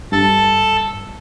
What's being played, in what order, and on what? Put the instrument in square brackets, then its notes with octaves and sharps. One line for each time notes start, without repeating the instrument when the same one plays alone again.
[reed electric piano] G2 [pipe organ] A4 A5